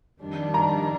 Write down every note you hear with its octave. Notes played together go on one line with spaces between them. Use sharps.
F2 D#3 G3 D4
A#5